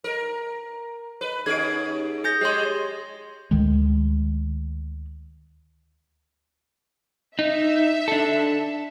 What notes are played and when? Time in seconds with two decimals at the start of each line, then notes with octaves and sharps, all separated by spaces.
0.04 A#4
1.21 B4
1.46 D#2 C#4 G#4 G#6 D7
2.24 G#4 G6 A#6
2.41 G#3 G4 G#4 C#5 C6
3.51 D2 D#3 G#3
7.39 D#4 E5
8.08 D4 A4